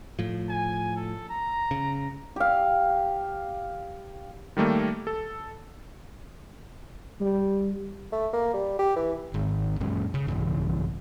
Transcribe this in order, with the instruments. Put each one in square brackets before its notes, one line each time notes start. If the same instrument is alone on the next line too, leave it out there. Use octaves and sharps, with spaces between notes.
[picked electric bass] A2 F3
[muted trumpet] G#5
A4
A#5
[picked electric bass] C#3
[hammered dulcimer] G4 F5
[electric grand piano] D#3 G3 A3 A#3
A4
[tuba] G3
[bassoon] A3
A#3
G3
G4
E3
[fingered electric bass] G#1 D#3
F#2 A#2 G#3 C#4
C#3
B1 G2 C#3 E3